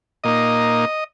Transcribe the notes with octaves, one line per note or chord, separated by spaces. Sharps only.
A#2 A#3 D#4 D#5